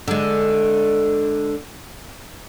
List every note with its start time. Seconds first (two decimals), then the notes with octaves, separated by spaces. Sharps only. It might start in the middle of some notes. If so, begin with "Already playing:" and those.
0.08 D3 G#3